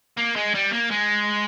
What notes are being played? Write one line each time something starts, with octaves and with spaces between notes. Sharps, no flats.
A#3
G#3
G3
A#3
G#3